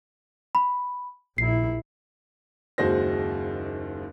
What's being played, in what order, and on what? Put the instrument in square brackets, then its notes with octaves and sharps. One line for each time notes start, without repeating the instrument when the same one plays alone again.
[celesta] B5
[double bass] A#1 E4 [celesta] C7
[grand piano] F#1 D#2 G#3 F#4 C5 A#6